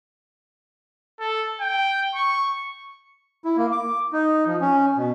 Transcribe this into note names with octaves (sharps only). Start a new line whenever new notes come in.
A4
G5
C#6
E4
A#3
D6
D#4
F3
C#4
B2